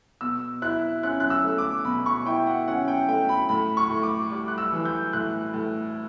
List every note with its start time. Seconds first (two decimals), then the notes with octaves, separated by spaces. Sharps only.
0.21 B2 E6
0.62 E4 F#6
1.03 C#4 F#6
1.20 F#6
1.30 E6
1.44 A3
1.58 D6
1.85 B2 B5
2.06 C#6
2.25 E4 G5
2.47 F#5
2.68 C#4 F#5
2.88 G5
3.09 A3 G5
3.29 B5
3.49 A2 B5
3.77 C#6
3.90 A2
4.03 D6
4.30 G3 D6
4.48 F#6
4.58 E6
4.73 E3
4.85 G6
5.13 A2 F#6
5.54 A2